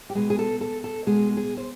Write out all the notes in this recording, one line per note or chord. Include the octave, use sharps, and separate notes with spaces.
G4
B2 G#3 G#4
G#4
A4
A4
A4
B2 G#3 G#4
G#4
C5